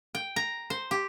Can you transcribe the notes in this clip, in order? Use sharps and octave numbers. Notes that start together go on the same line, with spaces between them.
G5
A#5
C5
G4